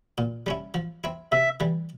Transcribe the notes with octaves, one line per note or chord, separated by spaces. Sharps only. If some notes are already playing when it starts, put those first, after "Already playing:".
A#2
G3 C#4 E4
F3
C4 E4
C3 E5
E3 G3